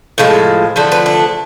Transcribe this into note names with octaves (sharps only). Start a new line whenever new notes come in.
A2 F3 G#3
D3 F3 A3 C5
B4
D4